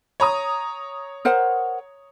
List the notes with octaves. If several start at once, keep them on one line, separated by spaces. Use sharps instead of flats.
C#5 A#5 D#6
A#4 C5 F#5